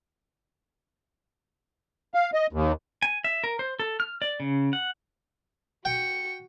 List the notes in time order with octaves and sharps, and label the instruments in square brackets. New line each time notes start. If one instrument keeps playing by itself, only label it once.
[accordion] F5
D#5
D#2
[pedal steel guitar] G#5
E5
A#4
C5
A4
F6
D5
C#3
F#5
[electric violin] F#4 C#7 [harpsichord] G5